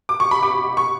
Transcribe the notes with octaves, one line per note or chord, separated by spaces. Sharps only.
D6
C#6
B5
D6
C#6